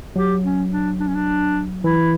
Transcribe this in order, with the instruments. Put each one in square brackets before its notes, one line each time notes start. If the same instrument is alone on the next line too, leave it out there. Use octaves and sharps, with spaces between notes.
[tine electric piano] F#3 [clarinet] G4
[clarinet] C#4
D4
D4
C#4
D4
[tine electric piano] E3 [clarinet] E4